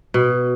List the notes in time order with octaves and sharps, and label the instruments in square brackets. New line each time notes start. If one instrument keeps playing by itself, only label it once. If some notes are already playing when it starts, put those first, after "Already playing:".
[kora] B2